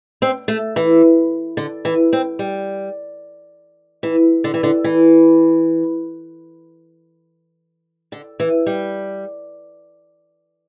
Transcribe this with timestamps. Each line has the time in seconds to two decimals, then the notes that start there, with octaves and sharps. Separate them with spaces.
0.22 C4
0.48 A3
0.76 E3
1.57 D3
1.85 E3
2.13 C4
2.39 G3
4.03 E3
4.44 D3
4.54 E3
4.63 D3
4.84 E3
8.12 D3
8.40 E3
8.66 G3